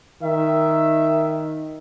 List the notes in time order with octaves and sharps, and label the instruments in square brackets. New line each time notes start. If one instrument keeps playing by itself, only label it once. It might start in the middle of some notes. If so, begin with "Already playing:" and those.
[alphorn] D#3 [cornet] E5